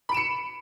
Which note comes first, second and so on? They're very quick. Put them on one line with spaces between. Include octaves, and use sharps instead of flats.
B5 D7 E7 C#7